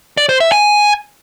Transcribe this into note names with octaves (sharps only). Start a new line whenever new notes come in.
D5
C5
E5
G#5